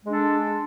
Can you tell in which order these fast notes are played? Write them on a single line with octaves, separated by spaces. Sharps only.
G#3 D4 A4